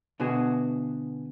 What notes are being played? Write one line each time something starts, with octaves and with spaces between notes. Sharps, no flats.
B2 D3 B3 F#4 G#4